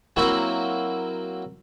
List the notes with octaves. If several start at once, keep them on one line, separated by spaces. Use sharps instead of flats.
F#3 A#3 C4 E4 F#4